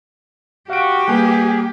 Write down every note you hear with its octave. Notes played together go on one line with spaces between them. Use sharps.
F#4 G4 F5 D7
G3 A#3 G#4 B4